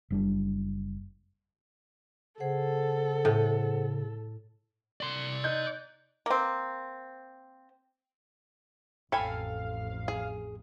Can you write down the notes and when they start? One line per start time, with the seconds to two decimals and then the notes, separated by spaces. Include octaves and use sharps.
0.10 F#1 G3 D4
2.40 C#3 G#4 A4 C5 F#5
3.25 A2
5.01 D5 C6
5.44 D#4 F#6 G6
6.26 A#3 C4
9.12 A1 F2 A4 F5 G5 G#5 B5
10.08 G#4